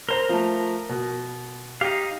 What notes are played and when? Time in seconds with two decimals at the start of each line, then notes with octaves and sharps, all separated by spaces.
0.09 A#4 C5 A#5 G7
0.29 F3 A3
0.89 B2
1.81 D#4 G4 F5